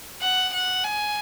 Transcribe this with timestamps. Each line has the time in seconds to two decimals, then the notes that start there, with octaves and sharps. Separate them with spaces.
0.21 F#5
0.53 F#5
0.84 G#5